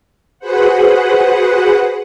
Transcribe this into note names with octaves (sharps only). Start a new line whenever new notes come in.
F#4 G#4 B4 C5 F#5